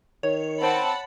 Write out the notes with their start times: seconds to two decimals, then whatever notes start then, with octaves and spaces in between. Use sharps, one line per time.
0.23 D#3 C#5
0.61 C4 F#5 A5 B5